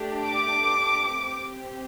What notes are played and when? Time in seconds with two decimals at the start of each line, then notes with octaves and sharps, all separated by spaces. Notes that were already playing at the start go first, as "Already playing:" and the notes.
Already playing: A3 D4 G4
0.24 D6
1.16 C4 G4